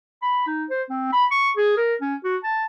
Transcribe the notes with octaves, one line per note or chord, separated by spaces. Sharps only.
B5
D#4
C5
C4
B5
C#6
G#4
A#4
C#4
F#4
A5